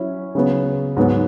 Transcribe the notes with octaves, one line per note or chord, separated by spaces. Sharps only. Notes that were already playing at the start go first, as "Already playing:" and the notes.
Already playing: F#3 C#4 E4
C#3 F#3 B3
G#2 F#3 B3